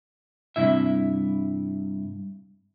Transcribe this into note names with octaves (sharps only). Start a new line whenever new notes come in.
G2 C3 E4 E5